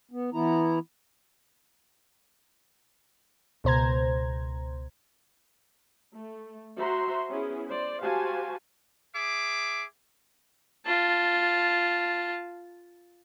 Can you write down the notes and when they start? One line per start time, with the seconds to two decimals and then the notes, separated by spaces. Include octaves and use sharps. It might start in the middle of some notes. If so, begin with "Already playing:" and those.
0.11 B3
0.33 E3 B3 E4 A#5
3.64 C#2 B2 C5 A#5 G#6
6.15 A3
6.78 F#4 C5 E5 A#5 C6
7.30 B3 C#4 E4 G#4
7.68 C5 D5
8.02 F#4 G4 C5 F5 G#5 A5
9.15 G#4 E5 D6
10.85 F4 A5